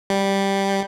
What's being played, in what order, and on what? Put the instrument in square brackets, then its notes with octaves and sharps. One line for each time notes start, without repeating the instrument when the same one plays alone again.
[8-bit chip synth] G3